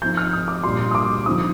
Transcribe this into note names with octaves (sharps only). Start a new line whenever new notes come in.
F3 C4 D#4 G6
F6
D#6
D6
A#2 G3 D4 F4 C6
D#6
D6
D3 F3 C4 D#4 D#6